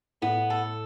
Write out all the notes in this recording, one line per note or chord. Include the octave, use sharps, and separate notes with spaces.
A2 B3
A4